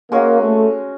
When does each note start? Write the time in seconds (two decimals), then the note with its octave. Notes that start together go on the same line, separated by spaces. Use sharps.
0.11 G#3 A#3 C#4 F#4
0.40 A3